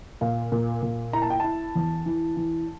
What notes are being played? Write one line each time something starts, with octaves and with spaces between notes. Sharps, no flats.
A#2 F5
A#2
A#2
E4 A#5
A5
G5
E4 A5
E2
E3
E3